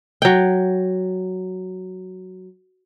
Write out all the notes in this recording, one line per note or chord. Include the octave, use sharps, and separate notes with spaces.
F#3 G5